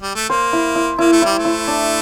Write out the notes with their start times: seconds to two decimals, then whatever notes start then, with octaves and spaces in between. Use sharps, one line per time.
0.02 G3
0.16 A3
0.30 A#3 C5
0.53 E4
0.75 E4
0.99 A#3 E4
1.12 A3
1.22 G3 E4
1.39 A3
1.45 E4
1.67 D4